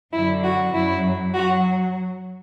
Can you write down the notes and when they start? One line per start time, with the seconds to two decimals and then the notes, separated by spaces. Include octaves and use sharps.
0.13 F#2 D3 F#3 E4
0.43 F#4
0.73 F#2 F#3 E4
1.34 F#3 F#4